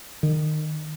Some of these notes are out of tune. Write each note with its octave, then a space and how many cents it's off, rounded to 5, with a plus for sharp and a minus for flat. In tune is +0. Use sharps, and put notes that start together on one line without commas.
D#3 -20